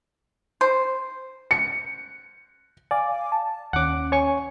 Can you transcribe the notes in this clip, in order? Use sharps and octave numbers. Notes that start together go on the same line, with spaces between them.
C5
C#7
D5 F5 G#5 D6
A5
D#2 C#4 F#5 D6
C#5 G#5 C#6